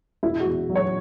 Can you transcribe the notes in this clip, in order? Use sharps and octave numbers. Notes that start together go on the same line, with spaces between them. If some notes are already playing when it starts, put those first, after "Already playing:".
E1 E4
F#4
E2
F#3
C#5